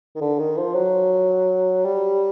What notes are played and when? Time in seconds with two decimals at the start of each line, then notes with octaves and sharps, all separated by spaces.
0.16 D#3
0.21 D3
0.39 D#3
0.57 F3
0.75 F#3
1.85 G3